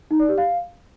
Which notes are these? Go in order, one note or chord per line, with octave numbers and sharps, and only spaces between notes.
D#4
D5
G4
F5